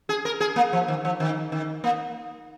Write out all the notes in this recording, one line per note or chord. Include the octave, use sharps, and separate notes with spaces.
G#4
A#4
G#4
A#3
F3
D#3
F3
D#3
D#3
A#3